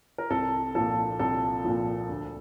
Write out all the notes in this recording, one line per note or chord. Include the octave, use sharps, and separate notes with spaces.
A#4
C2 A4
A#2 F3 A4
C2 A4
A#2 F3
D2